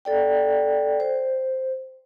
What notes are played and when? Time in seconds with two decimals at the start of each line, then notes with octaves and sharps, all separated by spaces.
0.05 A4 D5 G5
1.00 C5